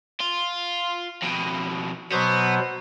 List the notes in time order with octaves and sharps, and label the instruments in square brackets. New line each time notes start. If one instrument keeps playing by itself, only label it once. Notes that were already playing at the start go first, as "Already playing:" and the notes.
[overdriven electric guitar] F4
F2 B2
[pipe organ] B2 F#3 C5 [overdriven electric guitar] B3